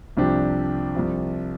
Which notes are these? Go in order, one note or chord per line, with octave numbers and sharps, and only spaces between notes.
C2 C3 F3 D4 G4
C2 C3 F3